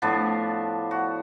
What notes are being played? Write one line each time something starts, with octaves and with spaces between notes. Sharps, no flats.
A2 F3 B3 D4
F#4